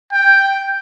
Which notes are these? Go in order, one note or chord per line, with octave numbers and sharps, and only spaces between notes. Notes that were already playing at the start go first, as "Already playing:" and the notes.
G5